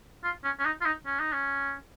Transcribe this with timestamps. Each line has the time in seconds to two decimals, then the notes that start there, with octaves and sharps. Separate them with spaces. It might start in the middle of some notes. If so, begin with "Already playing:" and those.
0.24 F4
0.44 C#4
0.59 C#4
0.65 D#4
0.81 F4
0.86 D#4
1.06 C#4
1.19 D#4
1.32 C#4